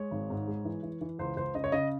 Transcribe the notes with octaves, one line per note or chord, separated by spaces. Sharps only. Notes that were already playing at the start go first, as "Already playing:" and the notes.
Already playing: G#3 C#5
G#1
G#2
G#3
E3
E3
E3
C#2 C5
C#2 C5
C#3 D#5
C#5
C#3 D#5